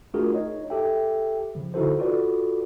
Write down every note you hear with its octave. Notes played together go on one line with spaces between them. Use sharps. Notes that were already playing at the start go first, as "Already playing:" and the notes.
A3 D4 F4 F#4 G#4 A#4
D#4 C#5 D#5
G4 A4 E5 G5
C#3 F3
D3 D#4 E4 F#4 A4 C5
F4 F#4 A4 B4 D5